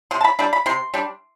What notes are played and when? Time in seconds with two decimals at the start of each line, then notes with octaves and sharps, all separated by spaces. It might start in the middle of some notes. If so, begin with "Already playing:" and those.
0.11 C3 C6
0.21 A5
0.24 B5
0.39 G3 D4 B5
0.53 B5
0.66 C3 C6
0.94 G3 D4